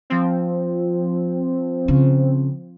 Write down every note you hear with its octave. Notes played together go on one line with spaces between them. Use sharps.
F3 C4
C#3